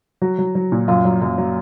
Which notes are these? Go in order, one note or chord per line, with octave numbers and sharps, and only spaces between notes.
F#3 F#4
F#3
F#3
A#2
F#2 F4
F#3
F#2
F#3